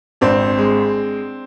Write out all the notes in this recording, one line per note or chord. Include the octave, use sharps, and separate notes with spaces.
G#1 C4 D4
G#3